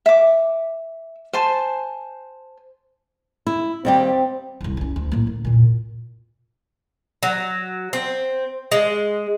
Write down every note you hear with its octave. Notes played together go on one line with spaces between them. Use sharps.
E5 D6
C5 G#5 A5 C6
E4
D#2 G3 C4 G4
F1 C2
E2 C#4
D2
A2 A#3
D2
E2 A#2
F#3
C4
G#3